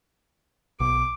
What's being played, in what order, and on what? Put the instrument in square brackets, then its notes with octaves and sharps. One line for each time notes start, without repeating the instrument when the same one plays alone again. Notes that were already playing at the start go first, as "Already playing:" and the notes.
[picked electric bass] B1 [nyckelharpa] D6